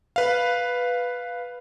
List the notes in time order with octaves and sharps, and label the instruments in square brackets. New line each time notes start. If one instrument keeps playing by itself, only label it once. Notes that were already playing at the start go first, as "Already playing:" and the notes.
[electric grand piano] B4 F5